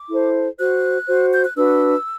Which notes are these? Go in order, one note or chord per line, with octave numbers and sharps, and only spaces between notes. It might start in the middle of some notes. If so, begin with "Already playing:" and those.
Already playing: D6
E4 A4 C5
F#4 C5 F#6
F#4 C5
G6
F#6
D4 F#4 B4 E6